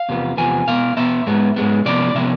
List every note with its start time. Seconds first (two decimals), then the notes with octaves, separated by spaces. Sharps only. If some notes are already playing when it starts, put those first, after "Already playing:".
Already playing: F5
0.09 E2 C3 F3 B3
0.37 E2 C3 F3 B3 G#5
0.67 B2 B3 F5
0.97 B2 B3 E5
1.27 G#2 G#3 B3
1.56 G#2 G#3 B3
1.85 C3 F3 B3 D5
2.15 C3 F3 B3 E5